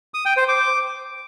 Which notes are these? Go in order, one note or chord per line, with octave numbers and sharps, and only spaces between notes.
D#6
G5
C5
D6